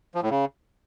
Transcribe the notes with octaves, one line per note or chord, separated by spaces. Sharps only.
F3
A2
C#3